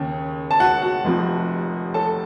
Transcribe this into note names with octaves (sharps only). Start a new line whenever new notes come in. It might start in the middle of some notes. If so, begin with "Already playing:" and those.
Already playing: D#2 C#3
A5
F#4 F#5
F#4 F#5
F1 F2 C3 F3
A4 A5